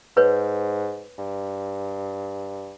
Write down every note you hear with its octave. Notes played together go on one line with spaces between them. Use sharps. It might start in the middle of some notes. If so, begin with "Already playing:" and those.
G#2 B4 C#5
G2